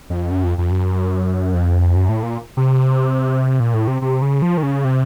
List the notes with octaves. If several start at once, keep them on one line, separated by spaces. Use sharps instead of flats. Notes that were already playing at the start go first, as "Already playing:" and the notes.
F2
F#2
F2
F2
F#2
F2
F#2
A2
A#2
C3
A#2
A2
C3
C3
C#3
F3
D#3
C#3
C3